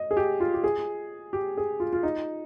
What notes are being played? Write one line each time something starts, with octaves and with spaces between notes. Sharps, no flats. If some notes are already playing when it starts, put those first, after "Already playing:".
Already playing: D#5
G#4
G4
F4
G4
G#4
G4
G#4
F4
F4
D#4